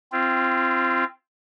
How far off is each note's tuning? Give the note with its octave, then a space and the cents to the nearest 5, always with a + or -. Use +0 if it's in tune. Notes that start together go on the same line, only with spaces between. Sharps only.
C4 +0 F4 -25